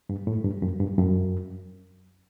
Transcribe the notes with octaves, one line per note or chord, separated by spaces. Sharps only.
G2
A2
G2
F#2
G2
F#2